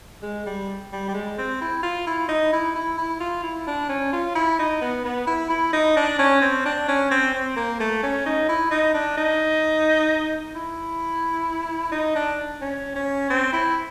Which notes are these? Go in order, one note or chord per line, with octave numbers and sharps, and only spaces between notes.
G#3
G3
G3
G3
G#3
C4
E4
F4
E4
D#4
E4
E4
E4
F4
E4
D4
C#4
F4
E4
D#4
B3
B3
E4
E4
D#4
D4
C#4
C4
D4
C#4
C4
C4
A#3
A3
C#4
D#4
E4
D#4
D4
D#4
E4
D#4
D4
C#4
C#4
C4
E4